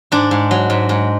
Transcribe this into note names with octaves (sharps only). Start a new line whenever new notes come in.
G#2 D4
G#2
F#3
G#2
G#2